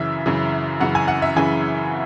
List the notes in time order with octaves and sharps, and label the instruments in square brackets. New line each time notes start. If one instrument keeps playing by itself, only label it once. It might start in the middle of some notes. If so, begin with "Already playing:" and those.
Already playing: [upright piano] F#2 C#3 E3 E5
F#2 C#3 E3
F#2 C#3 E3 F#5
G#5
F#5
E5
F#2 C#3 E3 G#5